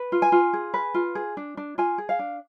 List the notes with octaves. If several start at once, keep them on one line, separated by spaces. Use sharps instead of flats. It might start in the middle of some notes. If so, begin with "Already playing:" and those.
Already playing: B4
F4
G#5
F4
G#4
B4
F4
G#4
D4
D4
F4 G#5
G#4
F5
D4